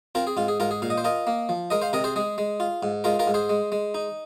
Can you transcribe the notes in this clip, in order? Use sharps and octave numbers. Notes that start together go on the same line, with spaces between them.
C4 F4 A#4
G#4
G#2 F4
G#4
G#2 F4 A#4
G#4
A#2 F5
D#5
C5
F4 A#4 D#5
A#3
F3
G#3 A#4 D#5
C5 F5
C3 A#4 D#5
G#4 C5
G#3 G#4
G#3
F4
G#2
G#3 F4 A#4
F4 A#4
G#2
G#4 C5
G#3
G#3
D#4